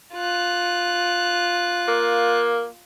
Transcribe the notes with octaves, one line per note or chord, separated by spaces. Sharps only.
F4 F#6
A#3